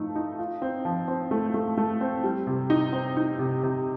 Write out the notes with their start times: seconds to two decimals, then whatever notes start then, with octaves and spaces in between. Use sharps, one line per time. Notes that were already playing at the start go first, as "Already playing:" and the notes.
Already playing: F3 A3 D#4
0.16 D#4
0.39 F4
0.62 C4
0.85 F3
1.08 C4
1.31 A3
1.54 A3
1.77 A3
2.01 C4
2.24 G3
2.47 C3
2.70 D#4
2.93 C4
3.17 D#4
3.39 C3
3.63 C3